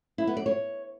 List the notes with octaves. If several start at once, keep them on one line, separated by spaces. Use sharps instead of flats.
E4
B3
D5
C#5